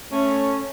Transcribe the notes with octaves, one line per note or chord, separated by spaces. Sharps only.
A3 C#4